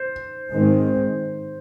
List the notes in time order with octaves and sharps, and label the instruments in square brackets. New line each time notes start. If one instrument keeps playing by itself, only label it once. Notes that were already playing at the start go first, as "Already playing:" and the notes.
Already playing: [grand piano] C5
[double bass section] G#2 D#3 G#3 C4